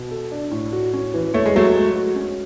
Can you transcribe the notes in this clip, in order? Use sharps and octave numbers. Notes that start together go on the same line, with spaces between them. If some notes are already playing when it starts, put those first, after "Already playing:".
Already playing: B2
A4
D4
A2
F#4
C#4
E3
A3 C#5
G#3
F#3 A3 G#4
G#3
F#4
C#4